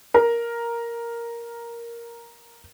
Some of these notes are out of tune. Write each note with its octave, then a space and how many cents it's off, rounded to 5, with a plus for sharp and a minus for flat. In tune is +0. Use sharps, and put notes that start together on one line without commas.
A#4 +5